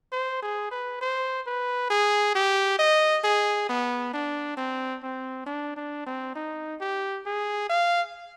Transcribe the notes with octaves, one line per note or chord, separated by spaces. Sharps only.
C5
G#4
B4
C5
B4
G#4
G4
D#5
G#4
B3
D4
C4
C4
D4
D4
C4
D#4
G4
G#4
F5